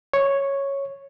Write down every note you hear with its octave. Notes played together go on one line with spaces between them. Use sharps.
C#5